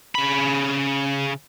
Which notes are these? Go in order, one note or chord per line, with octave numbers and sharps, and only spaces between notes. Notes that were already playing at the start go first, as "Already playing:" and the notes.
C#3 B5